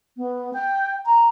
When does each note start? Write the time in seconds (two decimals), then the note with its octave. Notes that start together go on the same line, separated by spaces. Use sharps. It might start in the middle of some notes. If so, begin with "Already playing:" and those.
0.17 B3
0.53 G5
1.06 A#5